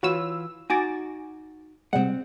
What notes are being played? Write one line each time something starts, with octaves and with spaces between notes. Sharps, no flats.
E3 F4 F#4 B4 C#5 E6
D#4 F#4 G#5 D6 A6
C3 G3 G#3 C4 F#5